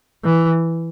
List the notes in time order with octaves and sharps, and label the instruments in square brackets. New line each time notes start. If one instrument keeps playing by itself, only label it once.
[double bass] E3